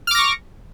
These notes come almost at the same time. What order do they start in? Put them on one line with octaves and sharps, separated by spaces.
F6 D6 A#6 C#6